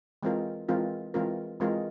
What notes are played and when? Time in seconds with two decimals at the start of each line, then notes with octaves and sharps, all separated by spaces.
0.23 E3 G#3 C4 F4 A#4
0.68 E3 G#3 C4 F4 A#4
1.14 E3 G#3 C4 F4 A#4
1.60 E3 G#3 C4 F4 A#4